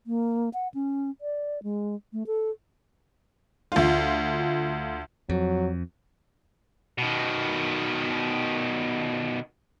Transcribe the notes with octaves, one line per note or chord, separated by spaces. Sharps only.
A#3
F#5
C#4
D5
G#3
A3
A4
D2 F4
F2 F#3
B2 D#3